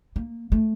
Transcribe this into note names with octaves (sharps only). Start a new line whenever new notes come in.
A#3
A3